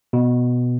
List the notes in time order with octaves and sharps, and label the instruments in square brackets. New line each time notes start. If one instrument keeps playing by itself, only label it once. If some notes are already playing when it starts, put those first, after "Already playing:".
[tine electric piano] B2